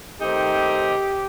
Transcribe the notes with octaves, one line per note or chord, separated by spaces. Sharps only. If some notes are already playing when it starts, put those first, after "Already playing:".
D#3 A3 C4 D#4 G4